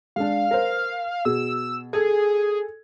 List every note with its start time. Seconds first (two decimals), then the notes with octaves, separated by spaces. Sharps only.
0.16 G#3 D4 F5
0.51 A#4 C5
1.25 B2 G#4 E6
1.93 G#4 A4 G#6